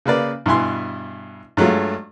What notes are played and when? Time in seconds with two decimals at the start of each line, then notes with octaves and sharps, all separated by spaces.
0.06 C#3 A#3 B4 D5
0.46 G2 B2 E4 G#5 C6
1.57 G2 F#3 G#3 A3 F4